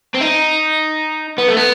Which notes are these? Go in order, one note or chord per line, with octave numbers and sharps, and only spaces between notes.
C4
D#4
B3
A3
B3